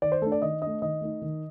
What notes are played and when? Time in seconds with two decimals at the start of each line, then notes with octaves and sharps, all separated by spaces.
0.02 D#3 D5
0.12 C5
0.22 A3 D4 A4
0.32 D5
0.42 D#3 D#5
0.62 A3 D4 D#5
0.82 D#3 D#5
1.01 A3 D#4
1.22 D#3